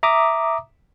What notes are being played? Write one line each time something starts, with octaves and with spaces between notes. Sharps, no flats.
E5 A#5 D6 D#6